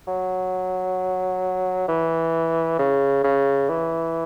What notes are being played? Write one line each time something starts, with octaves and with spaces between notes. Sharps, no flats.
F#3
E3
C#3
C#3
E3